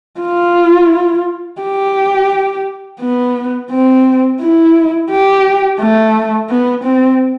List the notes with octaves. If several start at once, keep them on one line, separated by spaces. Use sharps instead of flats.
F4
G4
B3
C4
E4
G4
A3
B3
C4